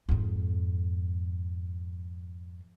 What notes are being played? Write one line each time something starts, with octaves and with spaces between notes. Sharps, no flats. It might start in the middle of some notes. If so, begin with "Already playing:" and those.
F2 G#2